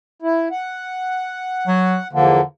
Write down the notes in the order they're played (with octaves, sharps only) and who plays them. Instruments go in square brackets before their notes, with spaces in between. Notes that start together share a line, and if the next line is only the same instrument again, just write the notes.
[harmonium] E4
F#5
[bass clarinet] F#3
[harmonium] E2 F3 A#3 [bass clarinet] D3